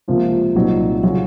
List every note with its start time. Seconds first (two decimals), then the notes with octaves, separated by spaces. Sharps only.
0.08 C#2 C3 F3 A#3 F4
0.55 C2 A#2 F#3 C4 D#4
1.03 C#3 F#3 C#4 F4